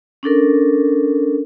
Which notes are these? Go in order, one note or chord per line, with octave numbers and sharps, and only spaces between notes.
C#4 D4 A4 A#4